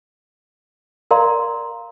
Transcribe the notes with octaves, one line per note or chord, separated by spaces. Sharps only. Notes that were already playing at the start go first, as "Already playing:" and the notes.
A#4 D5 F5 A#5 C6